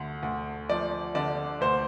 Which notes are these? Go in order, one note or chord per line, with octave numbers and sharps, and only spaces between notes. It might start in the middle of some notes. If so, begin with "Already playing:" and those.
Already playing: D2 D3
D2
F3 D5
D3 D5
D2 C5